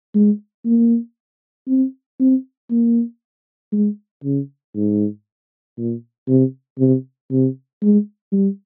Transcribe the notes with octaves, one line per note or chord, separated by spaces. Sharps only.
G#3
A#3
C4
C4
A#3
G#3
C#3
G#2
A#2
C3
C3
C3
G#3
G3